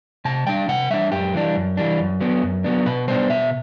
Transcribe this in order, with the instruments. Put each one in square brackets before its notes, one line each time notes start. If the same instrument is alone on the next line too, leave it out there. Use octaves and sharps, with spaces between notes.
[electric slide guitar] C3 A5
G3 D4 G5
C3 F#5
G3 D4 E5
F#2 G4
E3 G3 D4
F#2
E3 G3 D4
F#2
F#3 B3 D4
F#2
F#3 B3 D4
B2 B4
G3 B3 D4 C5
B2 E5